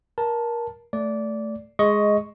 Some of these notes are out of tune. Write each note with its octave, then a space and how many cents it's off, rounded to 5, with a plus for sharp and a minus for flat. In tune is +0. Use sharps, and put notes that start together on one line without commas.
A#4 +20 A5 +0
A3 +0 D5 -15
G#3 +0 D#5 +10 C#6 +0